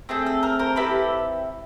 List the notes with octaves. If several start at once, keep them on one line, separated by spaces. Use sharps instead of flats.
A3 C4 G#4 A4
A4
A#4
A#4 C5
C4 E4 G4 A4 B4